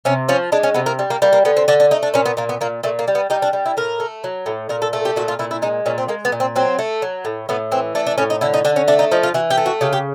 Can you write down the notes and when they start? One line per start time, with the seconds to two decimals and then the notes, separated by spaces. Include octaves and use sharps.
0.05 C3 C#4
0.29 F3 C#4
0.52 G#3 D4
0.63 C#4
0.74 C3 B3
0.86 A#3
0.99 G3
1.10 A#3
1.22 G3 A#3
1.33 A#3
1.45 D3 B3
1.57 C4
1.68 D3 D4
1.80 D4
1.91 A3 D#4
2.03 D4
2.14 A#2 C#4
2.26 B3
2.37 A#2 A#3
2.49 B3
2.61 A#2 A#3
2.83 A#2 A3
2.99 A#3
3.08 G3
3.15 B3
3.30 G3 D#4
3.42 D4
3.53 G3
3.66 E4
3.77 A2 A#4
4.00 A3
4.24 F#3
4.46 A2
4.69 A#2 A#4
4.82 A4
4.93 A3 A4
5.05 G4
5.16 A#2 F#4
5.28 F4
5.39 A#2 E4
5.51 E4
5.62 G#3 D#4
5.86 A#2 C#4
5.98 C4
6.08 G#3 A#3
6.25 B3
6.32 A#2
6.40 C4
6.56 F#3 C4
6.79 A3
7.02 F#3
7.25 A2
7.49 A2 B3
7.72 E3 C4
7.95 A3 D4
8.07 D4
8.18 A2 C#4
8.30 D#4
8.41 D3 E4
8.54 D#4
8.65 D3 D4
8.76 C#4
8.88 A3 D4
8.99 D#4
9.11 F3 D#4
9.23 F4
9.34 E3 F#4
9.50 G4
9.57 A3
9.66 F#4
9.81 C#3 G4
9.93 G4